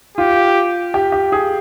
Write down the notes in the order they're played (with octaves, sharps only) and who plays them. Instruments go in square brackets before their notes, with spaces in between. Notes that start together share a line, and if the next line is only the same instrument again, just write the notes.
[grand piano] F4 [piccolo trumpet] G4
[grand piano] G4
G4
G#4